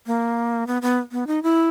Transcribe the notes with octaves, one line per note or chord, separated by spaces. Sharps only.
A#3
B3
B3
B3
D#4
E4